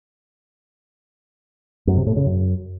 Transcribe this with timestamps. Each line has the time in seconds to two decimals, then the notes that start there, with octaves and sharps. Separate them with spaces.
1.87 F#2
1.97 C3
2.07 A2
2.16 C#3
2.26 F#2